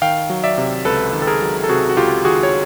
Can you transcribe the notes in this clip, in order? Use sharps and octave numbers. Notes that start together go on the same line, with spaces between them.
D#3 F5 G5
F#3
D5 E5
C3
C#2 A4 B4
D#3
A4
G#4 A#4
F#3
A4
C3 F#4 G#4
F#4
C#2 F4 G4
D#3 F#4 G#4
C#5